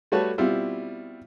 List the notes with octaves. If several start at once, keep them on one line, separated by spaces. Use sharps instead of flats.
G3 A3 F#4 B4 C#5 A5
B2 G3 C4 E4 F4